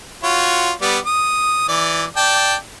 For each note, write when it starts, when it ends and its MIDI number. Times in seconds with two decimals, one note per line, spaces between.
0.23 0.71 65
0.23 0.71 66
0.23 0.71 73
0.81 0.98 55
0.81 0.98 59
0.81 0.98 74
1.06 1.67 87
1.69 2.04 52
1.69 2.04 74
2.17 2.54 74
2.17 2.54 79
2.17 2.54 81